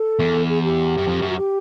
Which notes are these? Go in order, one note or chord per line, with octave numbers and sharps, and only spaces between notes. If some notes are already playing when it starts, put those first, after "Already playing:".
Already playing: A4
E2
G#4
G4
F#2
F2
F#2
F#4
G4